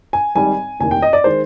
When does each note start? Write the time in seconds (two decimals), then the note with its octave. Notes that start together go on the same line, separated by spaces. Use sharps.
0.13 G#5
0.35 G#1 G#2 G3 G#5
0.80 F1 D#2 D#3 G#5
0.91 G5
1.02 D#5
1.13 D5
1.24 D#3 G#3 C5